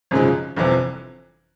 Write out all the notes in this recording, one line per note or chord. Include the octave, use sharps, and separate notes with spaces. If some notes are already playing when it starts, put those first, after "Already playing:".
G#1 F#2 C#3 F3 G#3
G1 F2 C3 E3